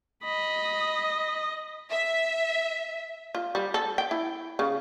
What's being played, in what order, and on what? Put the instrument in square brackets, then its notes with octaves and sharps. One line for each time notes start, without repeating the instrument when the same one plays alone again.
[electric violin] D#5 [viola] B5
[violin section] E5
[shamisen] F4
G3
A4
G5
E4
C#3